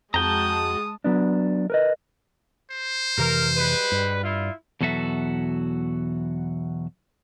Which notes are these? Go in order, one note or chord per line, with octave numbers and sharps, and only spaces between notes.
F2 G#3 F#4 G5 A5 A#5 D#6
F#3 B3 D4
A#4 B4 D#5
C5
F1 C3 E3 A#4
G3 G#3 B4
G2
E4 F4
E2 B2 F#3 F#4 A4 E5